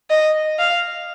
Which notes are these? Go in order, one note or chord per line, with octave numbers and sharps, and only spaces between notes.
D#5
F5